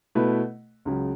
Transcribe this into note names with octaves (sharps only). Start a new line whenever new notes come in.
B2 A3 E4 B4
C#2 C#3 F#3